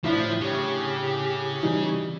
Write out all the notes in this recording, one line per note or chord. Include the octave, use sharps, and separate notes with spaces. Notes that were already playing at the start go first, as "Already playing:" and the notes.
A2 F3 D4 E4 F4 B6
C#3 C#4 G4
E3 G3 D#4